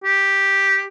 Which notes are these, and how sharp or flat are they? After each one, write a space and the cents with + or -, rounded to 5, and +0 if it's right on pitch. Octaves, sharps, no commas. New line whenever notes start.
G4 +0